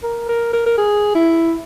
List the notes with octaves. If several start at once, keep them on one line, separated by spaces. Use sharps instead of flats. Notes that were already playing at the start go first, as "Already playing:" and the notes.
A#4
A#4
A#4
A#4
G#4
E4